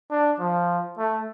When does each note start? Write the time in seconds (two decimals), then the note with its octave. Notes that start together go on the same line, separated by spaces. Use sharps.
0.11 D4
0.40 F3
0.98 A3